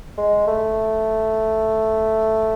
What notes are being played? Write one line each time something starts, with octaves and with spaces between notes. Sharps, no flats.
G#3
A3